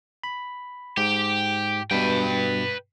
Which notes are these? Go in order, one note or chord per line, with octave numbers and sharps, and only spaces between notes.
B5
G#2 G4
G2 B2 B4 G5